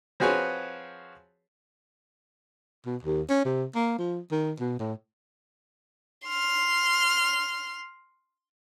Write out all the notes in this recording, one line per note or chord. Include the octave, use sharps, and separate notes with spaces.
F3 C4 F#4 G#4 B4 C#5
B2
D#2
C#4
C3
A#3
F3
D#3
B2
A2
C6 F6